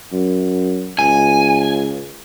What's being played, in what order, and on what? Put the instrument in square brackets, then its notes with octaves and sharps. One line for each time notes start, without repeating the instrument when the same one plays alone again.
[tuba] F#2
[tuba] C#2 [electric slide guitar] G#5